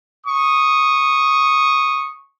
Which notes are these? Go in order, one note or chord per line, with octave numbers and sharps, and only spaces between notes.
C#6 D#6